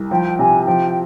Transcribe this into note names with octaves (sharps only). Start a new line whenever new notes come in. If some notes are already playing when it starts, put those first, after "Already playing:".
Already playing: C2
F3 G5
C3 G#5
F3 G5